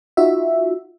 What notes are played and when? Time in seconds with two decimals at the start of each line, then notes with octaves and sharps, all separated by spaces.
0.17 D#4 F4 F#4 E5